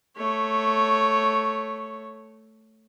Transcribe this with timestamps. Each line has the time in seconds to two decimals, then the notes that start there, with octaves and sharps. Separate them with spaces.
0.16 A3 C#5